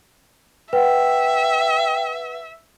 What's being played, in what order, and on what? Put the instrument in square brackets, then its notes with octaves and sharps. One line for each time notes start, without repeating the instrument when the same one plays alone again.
[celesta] B4 F#5 [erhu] E5 [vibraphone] G5